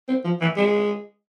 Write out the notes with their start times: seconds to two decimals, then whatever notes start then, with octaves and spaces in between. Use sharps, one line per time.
0.08 C4
0.25 F3
0.41 E3
0.57 G#3